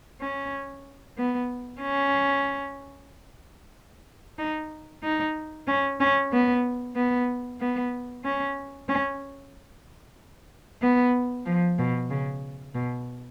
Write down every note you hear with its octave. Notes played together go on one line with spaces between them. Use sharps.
C#4
B3
C#4
D#4
D#4
C#4
C#4
B3
B3
B3
C#4
C#4
B3
F3
B2
C#3
B2